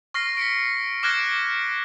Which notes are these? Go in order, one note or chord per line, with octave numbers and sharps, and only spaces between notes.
C#6 F6 A#6 C7
B6 C#7 D7
D6 F6 F#6 G#6 A#6 D7